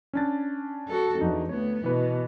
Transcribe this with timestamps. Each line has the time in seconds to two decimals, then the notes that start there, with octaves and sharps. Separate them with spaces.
0.13 C#4 D4 A6
0.88 F#4 A4
1.19 E2 D4 D#4 F#4
1.49 D2 B3 C#5
1.84 B2 E3 B4